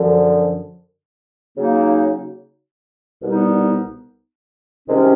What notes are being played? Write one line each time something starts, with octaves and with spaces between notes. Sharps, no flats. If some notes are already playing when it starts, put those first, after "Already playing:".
Already playing: F#2 D3 F3
C#3 F#3 A#3 D#4
C2 B2 G3 B3 D#4
C2 C3 D#3 G#3 C#4